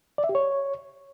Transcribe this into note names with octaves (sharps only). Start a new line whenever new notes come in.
D5
E5
G4
C#5